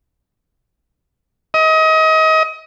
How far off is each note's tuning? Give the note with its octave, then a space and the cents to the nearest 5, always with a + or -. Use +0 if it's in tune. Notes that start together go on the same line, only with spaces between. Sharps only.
D#5 +30